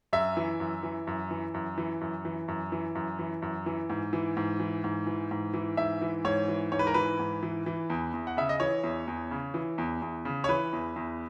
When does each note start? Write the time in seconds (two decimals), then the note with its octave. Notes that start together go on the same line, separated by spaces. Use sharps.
0.13 F#2 E5
0.37 E3
0.60 F#2
0.83 E3
1.07 F#2
1.31 E3
1.54 F#2
1.78 E3
2.01 F#2
2.25 E3
2.48 F#2
2.72 E3
2.95 F#2
3.19 E3
3.42 F#2
3.66 E3
3.90 G#2
4.13 E3
4.37 G#2
4.60 E3
4.84 G#2
5.07 E3
5.31 G#2
5.54 E3
5.77 G#2 E5
6.01 E3
6.25 G#2 C#5
6.48 E3
6.72 G#2 C#5
6.79 B4
6.87 A#4
6.94 E3 B4
7.19 G#2
7.43 E3
7.66 E3
7.90 E2
8.14 E2
8.27 F#5
8.37 C#3 E5
8.49 D#5
8.60 E3 C#5
8.83 E2
9.08 E2
9.31 C#3
9.54 E3
9.78 E2
10.02 E2
10.25 C#3
10.44 C#5
10.49 E3 B4
10.73 E2
10.96 E2